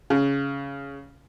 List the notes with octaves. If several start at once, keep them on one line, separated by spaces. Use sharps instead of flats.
C#3